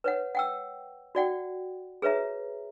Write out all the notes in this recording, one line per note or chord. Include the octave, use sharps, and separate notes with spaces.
B4 C#5 F#5
F#5 G5 E6
F#4 D5 F#5 G5
G#4 B4 C#5 E5 A#5